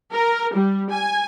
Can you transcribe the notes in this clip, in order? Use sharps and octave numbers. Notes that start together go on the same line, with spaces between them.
A#4
G3
G#5